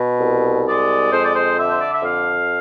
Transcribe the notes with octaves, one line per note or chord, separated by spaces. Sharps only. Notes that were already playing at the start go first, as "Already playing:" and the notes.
Already playing: B2
C2
G#3 D5
F2 C5
D5
C5
D3 E5
C5
D5
E5
F2 F5